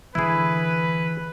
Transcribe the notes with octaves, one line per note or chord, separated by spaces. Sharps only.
D3 E3 E4 G#4 B4